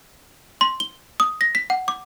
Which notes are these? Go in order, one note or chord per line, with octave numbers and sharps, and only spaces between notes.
C6
G7
D#6
A#6
B6
F#5
D6